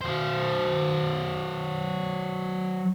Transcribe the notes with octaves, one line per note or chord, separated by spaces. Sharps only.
F#3 C5